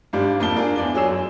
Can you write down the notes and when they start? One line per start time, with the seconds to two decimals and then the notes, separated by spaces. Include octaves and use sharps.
0.13 G#1 G3 D4 F5 G6
0.40 F2 A#3 F5 A5 G7
0.56 D4 F4 G#4 A#4
0.76 E2 D5 G7
0.94 F#3 G#4 C#5 E6 E7
1.07 F#2